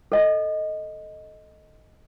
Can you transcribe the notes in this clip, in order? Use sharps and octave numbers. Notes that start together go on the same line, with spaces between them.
A4 D#5